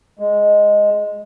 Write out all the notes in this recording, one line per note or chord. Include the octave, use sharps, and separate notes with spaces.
G#3